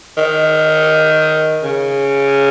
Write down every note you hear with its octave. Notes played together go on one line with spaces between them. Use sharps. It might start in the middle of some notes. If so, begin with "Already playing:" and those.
D#3
C#3